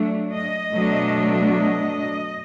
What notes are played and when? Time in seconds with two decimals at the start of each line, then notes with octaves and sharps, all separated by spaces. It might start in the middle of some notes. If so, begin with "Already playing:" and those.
Already playing: F#3 A3 D4
0.33 D#5
0.74 B2 F#3 A3 D4
1.54 D#5